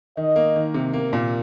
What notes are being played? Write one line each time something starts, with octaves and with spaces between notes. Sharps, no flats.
D#3 D#5
A#3
D#3
C3
A#3
A#2